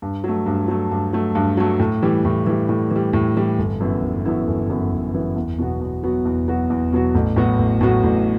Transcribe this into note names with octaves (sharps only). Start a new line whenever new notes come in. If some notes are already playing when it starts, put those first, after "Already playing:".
G2
F#3 A3
G2
F#3 A3
G2
F#3 A3
G2
F#3 A3
A2
E3 G3
A2
E3 G3
A2
E3 G3
A2
E3 G3
G1
F#2 E3 B3 E4
G1
F#2 E3 B3 E4
G1
F#2 E3 B3 E4
G1
F#2 E3 B3 E4
E2
B2 F#3 B3 F#4
E2
B2 F#3 B3 F#4
E2
B2 F#3 B3 F#4
E2
B2 F#3 B3 F#4
A1
A2 F#3 B3 F#4
A1
A2 F#3 B3 F#4
A1